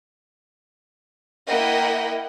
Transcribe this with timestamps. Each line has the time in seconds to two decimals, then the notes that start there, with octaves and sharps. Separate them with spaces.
1.47 A#3 E4 A#4 D#5 F#5 G5